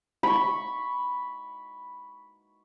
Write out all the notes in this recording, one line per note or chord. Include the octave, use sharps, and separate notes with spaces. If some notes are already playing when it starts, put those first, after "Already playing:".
B5 C#6